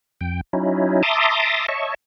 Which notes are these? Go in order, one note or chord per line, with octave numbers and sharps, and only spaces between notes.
F2 G5
F#3 C#4 D#4 E4
E5 A5 A#5 C6 D6 D#6
C#5 D#5 E5 A5 C#6